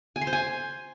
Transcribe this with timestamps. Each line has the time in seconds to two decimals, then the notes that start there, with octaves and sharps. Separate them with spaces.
0.16 G#5
0.21 C6
0.27 C5
0.33 G#5